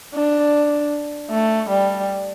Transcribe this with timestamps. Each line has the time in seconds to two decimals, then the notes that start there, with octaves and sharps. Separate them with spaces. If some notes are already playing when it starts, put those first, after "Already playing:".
0.14 D4
1.31 A3
1.70 G3